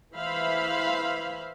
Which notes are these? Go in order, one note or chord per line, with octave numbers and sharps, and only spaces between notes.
E3 C5 E5 F5 B5